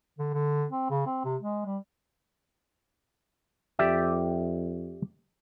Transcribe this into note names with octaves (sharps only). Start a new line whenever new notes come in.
D3
D3
C4
C#3
C4
C3
G#3
G3
F2 G4 D5 E5